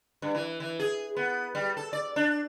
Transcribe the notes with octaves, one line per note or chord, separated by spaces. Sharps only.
G2
E3
E3
G#4
B3
G3
A4
D5
D4